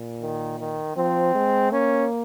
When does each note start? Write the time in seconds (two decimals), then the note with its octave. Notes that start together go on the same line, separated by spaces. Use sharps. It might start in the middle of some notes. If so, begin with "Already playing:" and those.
Already playing: A#2
0.21 D#3
0.59 D#3
0.96 F3 C4
1.34 G#3
1.71 A#3 C#4